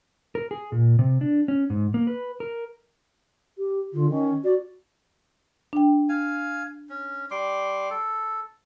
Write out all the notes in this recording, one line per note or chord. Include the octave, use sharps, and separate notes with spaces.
A#4
G#4
A#2
C3
D4
C#4
G#2
A#3
B4
A#4
G4
D3 F4
D#3 C#4
F#4 D5
D4 G5
F5 G#5
C#4
G3 C6 D6
A4